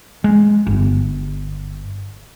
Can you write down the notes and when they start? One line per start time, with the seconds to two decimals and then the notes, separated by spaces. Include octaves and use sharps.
0.24 G#3
0.67 G1